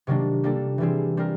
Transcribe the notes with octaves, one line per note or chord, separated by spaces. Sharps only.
C3 D#3 F#3 A#3 D4
G3 A#3 D4 F4 A4
E3 G3 C4 E4 G#4
G3 C4 F4 A#4